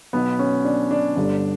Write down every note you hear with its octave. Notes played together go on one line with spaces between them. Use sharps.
B1 B2 B3
C#4
D4
D4
G1 G2 D3